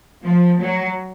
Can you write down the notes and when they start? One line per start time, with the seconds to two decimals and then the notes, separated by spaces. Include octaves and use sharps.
0.22 F3
0.58 F#3